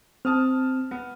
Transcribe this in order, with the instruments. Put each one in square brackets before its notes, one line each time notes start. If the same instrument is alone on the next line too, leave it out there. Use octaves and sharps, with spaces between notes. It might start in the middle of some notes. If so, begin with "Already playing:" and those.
[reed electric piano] C4 [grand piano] A5 D#6 F6
[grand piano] B3